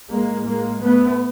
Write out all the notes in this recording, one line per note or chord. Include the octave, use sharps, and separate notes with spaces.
A2 G#3 A#3
G#3 A#3
A3 B3